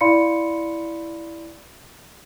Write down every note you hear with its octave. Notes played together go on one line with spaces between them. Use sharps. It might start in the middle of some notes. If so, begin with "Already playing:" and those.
E4 D5 F5 B5 C6 C#7